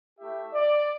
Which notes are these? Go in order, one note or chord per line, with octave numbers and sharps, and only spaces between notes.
A3 E4 G4 E5
D5